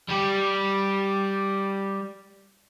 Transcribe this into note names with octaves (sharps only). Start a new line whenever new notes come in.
G3 G4